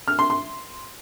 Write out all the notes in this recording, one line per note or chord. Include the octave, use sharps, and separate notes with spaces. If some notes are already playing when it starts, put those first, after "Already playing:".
F6
C6
C6